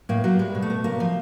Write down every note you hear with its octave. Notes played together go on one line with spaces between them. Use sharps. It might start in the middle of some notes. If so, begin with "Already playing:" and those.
A2 A#3
F#3 A#3
G3 G#3
B2
A3
B2
C#3 A#3
F3